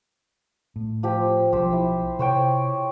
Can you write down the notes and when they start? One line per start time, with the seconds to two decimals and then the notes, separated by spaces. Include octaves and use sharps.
0.76 A2
1.03 F3 G4 C5
1.53 B1 F3 G4 C5
1.73 E4
2.19 C3 C5 C#5 G5